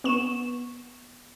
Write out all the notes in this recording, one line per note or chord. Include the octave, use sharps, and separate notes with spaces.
B3 C#6 E7